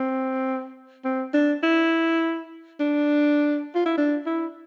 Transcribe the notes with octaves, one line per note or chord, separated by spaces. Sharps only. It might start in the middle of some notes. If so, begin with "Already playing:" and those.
Already playing: C4
C4
D4
E4
D4
F4
E4
D4
E4